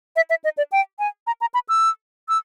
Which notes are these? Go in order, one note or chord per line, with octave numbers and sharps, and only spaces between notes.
E5
E5
D#5
D5
G5
G#5
A#5
A#5
B5
E6
E6